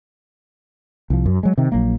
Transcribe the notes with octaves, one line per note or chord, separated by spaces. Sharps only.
C2 F3
F#2
F#3 G#3
C3 D#3
A#1 F#3 A#3